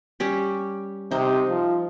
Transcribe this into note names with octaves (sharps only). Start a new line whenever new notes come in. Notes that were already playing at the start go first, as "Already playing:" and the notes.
G3 C#4 G4
C3 D#4 C5
F3